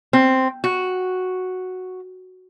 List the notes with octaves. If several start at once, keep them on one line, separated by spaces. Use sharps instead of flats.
C4
F#4